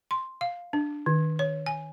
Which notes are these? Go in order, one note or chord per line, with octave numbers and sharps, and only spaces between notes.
C6
F5
D4
D#3
C#5
G#5